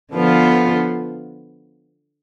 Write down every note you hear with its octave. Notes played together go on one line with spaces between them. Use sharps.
D3 F3 B3 F4